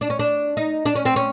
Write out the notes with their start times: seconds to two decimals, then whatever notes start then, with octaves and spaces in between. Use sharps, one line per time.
0.01 D4
0.10 C#4
0.19 D4
0.57 D#4
0.86 D4
0.95 C#4
1.05 C4
1.16 C#4